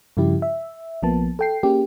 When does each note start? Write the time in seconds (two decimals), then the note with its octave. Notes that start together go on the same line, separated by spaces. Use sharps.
0.17 G2 C#3 F3 E4 G4
0.42 E5
1.02 A#1 F3 A#3 B3 A5
1.39 A4 G5 C7
1.63 A#3 C#4 G4 G#4